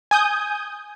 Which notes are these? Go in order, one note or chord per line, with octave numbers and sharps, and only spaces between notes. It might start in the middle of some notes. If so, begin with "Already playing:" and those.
G#5 D#6 G6